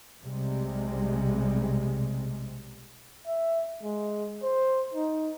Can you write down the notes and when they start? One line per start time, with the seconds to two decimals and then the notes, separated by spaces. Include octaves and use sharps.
0.21 B1 C3 G3 G#3
3.27 E5
3.83 G#3
4.42 C5
4.93 D#4